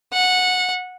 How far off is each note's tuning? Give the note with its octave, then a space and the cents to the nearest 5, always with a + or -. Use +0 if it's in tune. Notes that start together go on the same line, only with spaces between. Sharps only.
F#5 -15